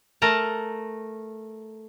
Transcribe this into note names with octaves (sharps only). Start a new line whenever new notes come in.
A3 A#4 A5 A#5